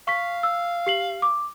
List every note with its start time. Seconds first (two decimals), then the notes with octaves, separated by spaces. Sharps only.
0.08 F5 C#6 B6
0.43 E6
0.86 G4 C7 F#7
1.22 D6